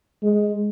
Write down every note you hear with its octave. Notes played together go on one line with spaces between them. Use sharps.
G#3